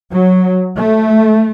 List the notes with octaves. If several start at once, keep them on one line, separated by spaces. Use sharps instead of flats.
F#3
A3